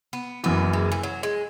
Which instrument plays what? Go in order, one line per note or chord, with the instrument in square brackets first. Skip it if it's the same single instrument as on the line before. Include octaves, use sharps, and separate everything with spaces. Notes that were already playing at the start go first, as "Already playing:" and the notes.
[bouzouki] B3
[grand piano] F#1 F#2 E3 [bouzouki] B3
[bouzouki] G#3
E3
F#3
G#3